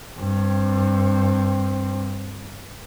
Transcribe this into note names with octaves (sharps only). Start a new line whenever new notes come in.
G2 C4